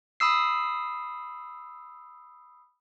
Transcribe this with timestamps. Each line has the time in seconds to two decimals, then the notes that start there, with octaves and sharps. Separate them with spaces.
0.20 B5 D#6 E6 C7